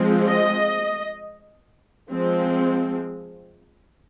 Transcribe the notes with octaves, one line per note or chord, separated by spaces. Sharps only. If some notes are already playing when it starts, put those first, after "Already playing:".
Already playing: F3 G#3 C4
D#5
F3 G#3 C4